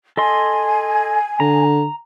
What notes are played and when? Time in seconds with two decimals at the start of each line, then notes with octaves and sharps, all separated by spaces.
0.17 A4 D#5 G#5 C6
1.40 D3 A#5